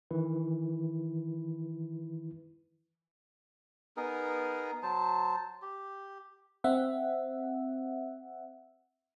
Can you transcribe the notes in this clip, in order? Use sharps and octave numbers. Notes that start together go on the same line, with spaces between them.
D#3 E3 E4 B4
B3 D#4 G#4 A#4
F#3 C5 A5
G4
C4 E5 F#5